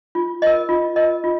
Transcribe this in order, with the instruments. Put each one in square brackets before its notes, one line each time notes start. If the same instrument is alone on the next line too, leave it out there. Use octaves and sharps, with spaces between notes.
[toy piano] F4
A#4 D#5
F4
A#4 D#5
F4